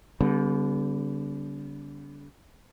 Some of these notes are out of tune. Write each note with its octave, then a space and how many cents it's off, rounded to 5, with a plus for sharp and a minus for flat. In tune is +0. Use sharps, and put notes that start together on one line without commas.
D3 -40 G3 +0 B3 +0